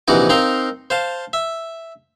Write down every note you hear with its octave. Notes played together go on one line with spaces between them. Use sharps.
A#1 C3 E3 D#4 F#4 D6
C4 D#4 A#4 F5 A#5 C6
C5 F5 A5
E5